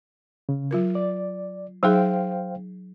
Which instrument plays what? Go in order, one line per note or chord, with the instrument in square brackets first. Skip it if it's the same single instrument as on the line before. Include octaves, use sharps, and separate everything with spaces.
[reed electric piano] C#3
[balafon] F#3 F4 A#4
[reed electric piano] D5
[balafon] F#3 D#4 G#4 [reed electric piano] C5 F5 G5